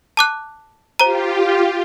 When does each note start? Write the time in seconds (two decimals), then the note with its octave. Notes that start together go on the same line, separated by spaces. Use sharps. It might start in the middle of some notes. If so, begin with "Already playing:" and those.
0.17 A5 D6 F#6
1.00 F4 G4 C5 A#5